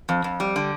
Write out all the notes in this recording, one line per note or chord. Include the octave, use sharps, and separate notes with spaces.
F2
F2
G3
D3